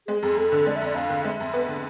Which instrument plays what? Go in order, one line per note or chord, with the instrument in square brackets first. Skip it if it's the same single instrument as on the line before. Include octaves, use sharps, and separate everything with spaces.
[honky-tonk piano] G#3 [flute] G#4
[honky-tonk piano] F2 [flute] G#4
[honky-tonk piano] F2 [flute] A4
[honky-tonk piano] D3
[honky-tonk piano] G#3 [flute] D5
[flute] E5
[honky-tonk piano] F2
[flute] D5
[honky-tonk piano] F2 [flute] F5
[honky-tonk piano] D3
[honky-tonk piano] G#3 [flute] E5
[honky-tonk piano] F2
B3
D3